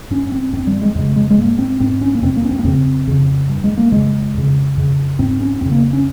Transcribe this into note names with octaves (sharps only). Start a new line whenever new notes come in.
G2 C#4
C4
G2 C4
G3
G#3
F2 C#3 G#3
G#3
G#3
G#2 A#3
C4
G#2 C4
C#4
A#3
F2 C3 C4
A#3
C#4
C4
A#3
F2 C#3 C4
F2 C#3
G2
G#3
A#3
F2 C#3 G#3
F2 C#3
F2 C#3
G#2 C4
C#4
F2 C#3 C4
A#3
C#4